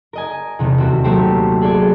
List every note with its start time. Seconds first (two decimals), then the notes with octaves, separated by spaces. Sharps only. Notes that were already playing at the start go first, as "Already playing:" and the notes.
0.13 A#4 D#5 G#5
0.59 E2 C3 A3
0.78 D#1 C4 F#4
1.04 F#3 A3 A#3 G4 C5
1.61 G#4 A4 D5 G#5